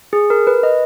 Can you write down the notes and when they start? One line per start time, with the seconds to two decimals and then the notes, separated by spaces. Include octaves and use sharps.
0.13 G#4
0.30 A#4
0.47 B4
0.63 D#5